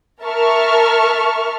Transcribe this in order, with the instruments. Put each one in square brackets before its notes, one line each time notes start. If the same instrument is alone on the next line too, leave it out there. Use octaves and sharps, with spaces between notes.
[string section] A#4 E5 A5 C#6 F6